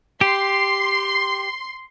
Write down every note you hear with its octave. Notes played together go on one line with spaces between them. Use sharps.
G4 C6